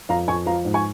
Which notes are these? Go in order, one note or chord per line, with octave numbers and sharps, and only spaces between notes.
F2 F5 A#5
F2 G#5 C#6
F3 F5 A#5
G#2
G#5 C#6